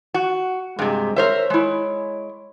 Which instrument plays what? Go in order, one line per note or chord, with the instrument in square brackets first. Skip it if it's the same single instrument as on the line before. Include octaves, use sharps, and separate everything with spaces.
[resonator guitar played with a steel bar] F#4
[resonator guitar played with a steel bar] G2 C3 [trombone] G#3
[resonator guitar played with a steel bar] A#4 C5 E5 [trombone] C#5
[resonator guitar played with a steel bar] G#3 E4